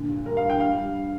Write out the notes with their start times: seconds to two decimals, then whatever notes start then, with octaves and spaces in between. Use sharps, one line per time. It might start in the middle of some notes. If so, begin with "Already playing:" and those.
Already playing: A#2 D3
0.09 G2
0.26 G3 A#4
0.37 F5
0.43 G2
0.50 G5
0.60 G3 F5
0.78 G3